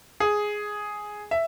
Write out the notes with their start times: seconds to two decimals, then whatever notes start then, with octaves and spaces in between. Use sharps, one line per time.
0.20 G#4
1.31 E5